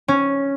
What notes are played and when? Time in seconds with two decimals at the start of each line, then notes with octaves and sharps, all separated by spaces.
0.08 C#4